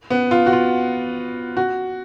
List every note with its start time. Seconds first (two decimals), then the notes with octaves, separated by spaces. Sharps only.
0.10 B3
0.31 F4
0.46 F#4
0.53 F4
1.57 F#4